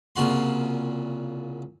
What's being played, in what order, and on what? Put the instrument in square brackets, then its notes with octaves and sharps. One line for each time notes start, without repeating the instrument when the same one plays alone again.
[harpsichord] C2 A#2 C#3 F#4 C6